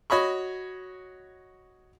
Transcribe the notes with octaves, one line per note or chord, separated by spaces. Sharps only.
F#4 C#5 D#5 B5 C#6